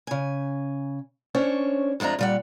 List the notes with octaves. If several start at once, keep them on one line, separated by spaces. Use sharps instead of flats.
C#3 G#5
C#4 D4 C5 C#5
F2 G#3 A3 D4 A#5
A#2 G3 F#5